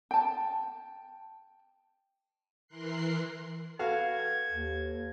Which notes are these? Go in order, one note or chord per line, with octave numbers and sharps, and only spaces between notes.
G5 A5
E3 A#4 C6 F#6 C7
F#4 A4 B4 F5 G#6
D#2